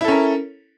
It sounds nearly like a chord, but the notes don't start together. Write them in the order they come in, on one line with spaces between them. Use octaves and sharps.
E4 A4 C#4 A#4